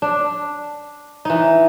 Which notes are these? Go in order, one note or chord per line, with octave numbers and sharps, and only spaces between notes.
D4
E3 D#4